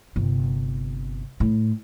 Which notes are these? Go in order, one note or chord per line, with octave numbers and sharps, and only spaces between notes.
G1 C3
A2